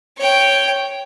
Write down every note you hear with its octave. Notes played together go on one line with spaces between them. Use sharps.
C#5 G5